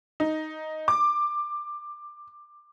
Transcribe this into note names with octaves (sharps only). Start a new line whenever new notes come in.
D#4
D6